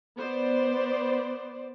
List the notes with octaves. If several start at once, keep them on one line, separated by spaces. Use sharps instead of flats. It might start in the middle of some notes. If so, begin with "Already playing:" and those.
B3 C5 D5